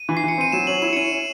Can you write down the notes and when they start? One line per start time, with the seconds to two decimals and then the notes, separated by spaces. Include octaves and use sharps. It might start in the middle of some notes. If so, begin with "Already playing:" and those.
Already playing: D#7
0.09 E3
0.17 C7
0.24 E3 C#7
0.38 C4 D#7
0.52 F#3 E7
0.67 C#4 F#7
0.82 E4 E7
0.93 C#7
0.96 C#4 D#7
1.12 C#4